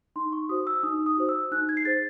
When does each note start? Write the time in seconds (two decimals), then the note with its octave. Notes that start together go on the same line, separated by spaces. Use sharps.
0.16 D#4 C6
0.33 C#6
0.49 F#4 C5 D#6
0.67 E6
0.83 D#4 D#6
1.06 D#6
1.17 F#4 C5
1.29 E6
1.52 D#4 F#6
1.69 G#6
1.77 C7
1.85 G#4 C5 A6